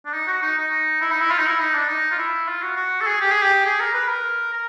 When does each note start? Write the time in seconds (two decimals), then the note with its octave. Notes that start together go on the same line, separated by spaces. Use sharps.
0.06 D4
0.14 D#4
0.28 F#4
0.42 D#4
0.58 D#4
1.01 E4
1.11 D#4
1.21 E4
1.31 F4
1.39 D#4
1.46 E4
1.60 D#4
1.74 D4
1.89 D#4
2.11 F4
2.19 E4
2.48 F4
2.62 F#4
2.77 F#4
3.01 A4
3.07 G#4
3.21 G4
3.31 G#4
3.42 G4
3.66 G#4
3.80 A#4
3.94 B4
4.09 A#4
4.53 A#4